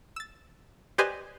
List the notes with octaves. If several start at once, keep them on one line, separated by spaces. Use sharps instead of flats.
E6 A6
G4 B4 C5 D5 D#5 G#5